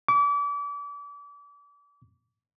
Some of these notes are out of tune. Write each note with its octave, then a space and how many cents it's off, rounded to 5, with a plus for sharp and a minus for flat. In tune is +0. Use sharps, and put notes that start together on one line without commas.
D6 -35